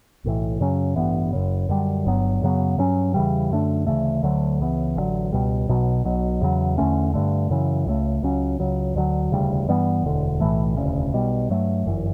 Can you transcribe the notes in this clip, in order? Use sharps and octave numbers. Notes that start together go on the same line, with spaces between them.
B1 A2 E3
F#2 C#3 F#3 C#4
A1 G2 E3 B3
F#1 F#2 C#3
F#2 D3 G3
G1 G2 F#3 B3
F#2 C#3 F#3 B3
G2 F#3 C#4
E2 C#3 E3 G3
F#2 D3 A3 D4
D2 C#3 E3 A3
D2 D3 F#3 A3
C#2 C#3 E3 B3
A1 G2 D3 F#3
C#2 B2 G3
B1 B2 F#3
B1 B2 F#3
E2 C#3 F#3
E2 D3 A3 C#4
G2 D3 A3
F#2 C#3 E3
C#2 C#3 F#3 A3
C#2 C#3 F#3 C#4
C#2 C#3 F#3
D2 D3 F#3
E1 D2 C#3 G3
G2 E3 G3 B3
E1 D2 D3
B1 A2 E3 A3
E1 D2 C#3
B1 B2 G3
G2 F#3 A3
G1 F#2 E3